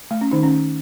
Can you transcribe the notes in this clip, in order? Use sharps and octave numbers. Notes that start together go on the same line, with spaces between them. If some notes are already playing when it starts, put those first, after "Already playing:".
A3
C#4
D#3 D#4
C#4